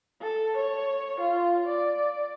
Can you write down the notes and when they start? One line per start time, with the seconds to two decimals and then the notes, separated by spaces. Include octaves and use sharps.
0.21 A4
0.57 C#5
1.20 F4
1.67 D5